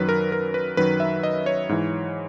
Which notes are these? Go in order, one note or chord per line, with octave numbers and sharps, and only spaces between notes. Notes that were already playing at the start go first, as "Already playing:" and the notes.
Already playing: F#2 D#3 F#3 B4
A#4
A#4
B4
F#2 D#3 F#3 B4
E5
D#5
C#5
G#2 E3